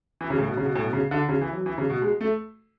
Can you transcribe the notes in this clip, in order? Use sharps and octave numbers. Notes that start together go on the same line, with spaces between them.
E3
C#3
A2
B2
C#3
B2
A2
B2
C#3
D3
C#3
E3
F#3
E3
C#3
B2
G#3
A3